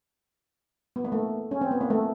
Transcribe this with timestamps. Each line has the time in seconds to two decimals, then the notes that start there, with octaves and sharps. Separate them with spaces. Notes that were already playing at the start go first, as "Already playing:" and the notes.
0.96 B3
1.05 A#3
1.12 A3
1.51 C#4
1.61 C4
1.71 B3
1.81 A#3
1.90 A3